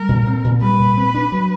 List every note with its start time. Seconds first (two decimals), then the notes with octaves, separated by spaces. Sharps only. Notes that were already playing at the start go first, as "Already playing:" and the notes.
Already playing: G3 A#4
0.09 A#2
0.27 C4
0.44 A#2
0.62 G3 B4
0.79 A#2
0.97 C4
1.15 D4
1.32 F#3